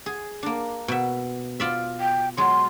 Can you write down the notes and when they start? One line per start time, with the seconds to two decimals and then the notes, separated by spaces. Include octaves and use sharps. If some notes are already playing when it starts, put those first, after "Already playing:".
0.06 G#4
0.43 A#3 D4
0.88 B2 E5
1.60 F4 D5 E5
2.00 G5
2.37 F#3 G#3 C6